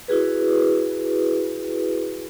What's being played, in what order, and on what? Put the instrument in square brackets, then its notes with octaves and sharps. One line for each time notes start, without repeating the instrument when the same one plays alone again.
[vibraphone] E4 F#4 G#4 B4